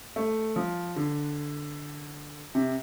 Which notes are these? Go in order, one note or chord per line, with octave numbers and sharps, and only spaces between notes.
A3
F3
D3
C3